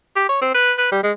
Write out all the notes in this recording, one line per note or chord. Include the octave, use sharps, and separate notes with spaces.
G4
C#5
C4
B4
B4
G3
G#3